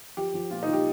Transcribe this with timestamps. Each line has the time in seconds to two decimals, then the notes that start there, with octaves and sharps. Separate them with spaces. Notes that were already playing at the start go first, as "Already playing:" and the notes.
0.17 F3 G4
0.34 F3
0.51 A#2 F4
0.63 D#4
0.68 F3
0.73 G4